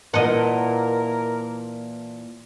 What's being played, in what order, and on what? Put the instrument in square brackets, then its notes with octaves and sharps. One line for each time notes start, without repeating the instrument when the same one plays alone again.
[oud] A#2 E3 [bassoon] A#4 [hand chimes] B4 A5 C6 [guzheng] D#5 F#5